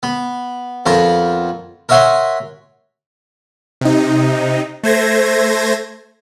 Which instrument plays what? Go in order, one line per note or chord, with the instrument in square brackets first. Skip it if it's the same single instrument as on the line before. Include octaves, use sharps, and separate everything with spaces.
[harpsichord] B3
F2 F3 B3 A#4 A#5
A#4 C#5 E5 F#5 G#5 C6
[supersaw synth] C3 D#4
A3 C5 G#6 A#6